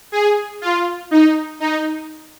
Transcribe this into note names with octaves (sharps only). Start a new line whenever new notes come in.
G#4
F4
D#4
D#4